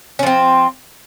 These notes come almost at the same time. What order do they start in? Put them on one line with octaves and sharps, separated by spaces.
C#4 F3 C4